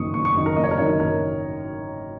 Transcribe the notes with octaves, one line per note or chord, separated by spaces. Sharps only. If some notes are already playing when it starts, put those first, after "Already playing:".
Already playing: F#1 F#2 D#3 C#6 D#6
F#1 C#6
C#6
F#2 D#3
A#4
F#1 D#5
C#5
A#4
F#2 D#3 C#5
F#1 A#4